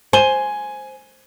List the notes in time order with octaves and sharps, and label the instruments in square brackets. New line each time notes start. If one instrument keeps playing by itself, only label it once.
[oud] C5 [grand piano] G#5 D#7 G7